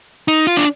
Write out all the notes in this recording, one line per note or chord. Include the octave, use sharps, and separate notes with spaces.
D#4
F4
D4